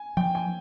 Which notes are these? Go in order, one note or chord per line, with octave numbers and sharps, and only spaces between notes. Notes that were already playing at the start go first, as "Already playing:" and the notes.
Already playing: G#5
F3 G5
G#5